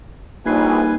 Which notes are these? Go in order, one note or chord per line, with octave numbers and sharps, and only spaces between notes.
A#1 G3 A#3 D#4 B4 G#5 C7